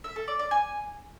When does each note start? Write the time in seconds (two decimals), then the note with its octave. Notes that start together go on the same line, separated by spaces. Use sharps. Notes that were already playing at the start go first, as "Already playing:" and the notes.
0.04 E5
0.16 A4
0.28 D5
0.39 D5
0.51 G#5